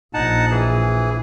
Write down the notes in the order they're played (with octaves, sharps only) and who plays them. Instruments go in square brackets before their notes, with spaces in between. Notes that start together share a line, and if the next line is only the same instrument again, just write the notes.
[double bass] A#1 [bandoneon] D#4 F#5 A5
[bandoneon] E3 G#4